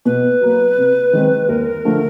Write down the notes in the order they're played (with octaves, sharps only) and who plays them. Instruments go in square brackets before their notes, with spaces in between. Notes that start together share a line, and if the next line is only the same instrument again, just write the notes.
[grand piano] B2 [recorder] B4
[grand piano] F#3 A#3
C3
D#3 G#3 C4
[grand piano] D#2 [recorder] A#4
[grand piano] D3 F3 A3